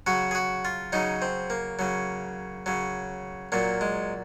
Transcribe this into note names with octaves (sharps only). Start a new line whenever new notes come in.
C#3 F#3 F#4
G#4
F#4
F4
C#3 F#3 D#4
C4
A#3
C#3 F#3
C#3 F#3
A#2 F#3 A#3
G#3